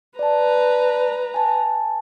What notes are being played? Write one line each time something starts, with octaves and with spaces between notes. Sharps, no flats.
B4 D5 A5 A#5
G#5 A5